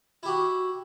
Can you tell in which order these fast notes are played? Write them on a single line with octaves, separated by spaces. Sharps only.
E4 G4 F#4